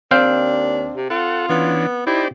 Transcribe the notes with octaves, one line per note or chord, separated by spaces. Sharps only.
D#2 C4 D4 F5 G5
C3
F4 A4 F#5
E3 B3 C#4 D4
D#4 E4 G4 C5 D5